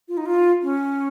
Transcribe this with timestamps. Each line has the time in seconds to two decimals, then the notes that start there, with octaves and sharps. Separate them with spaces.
0.08 F4
0.17 D#4
0.26 F4
0.62 C#4